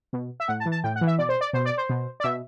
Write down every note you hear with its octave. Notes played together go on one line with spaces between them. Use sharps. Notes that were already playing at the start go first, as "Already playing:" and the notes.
B2
E5
A2 F#5
A5
E3
A5
A2 G5
F#5
E3
E5
B2 D5
C5
D5
B2 C5
D5
C5
B2
D5
B2 E5